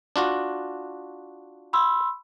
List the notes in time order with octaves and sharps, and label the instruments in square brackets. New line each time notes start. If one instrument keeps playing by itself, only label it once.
[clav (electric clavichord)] D4 F4 F#4
[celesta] B5 C6 E6